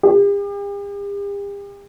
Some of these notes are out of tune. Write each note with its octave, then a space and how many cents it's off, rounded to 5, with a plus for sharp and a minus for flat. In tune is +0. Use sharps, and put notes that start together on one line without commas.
G4 +45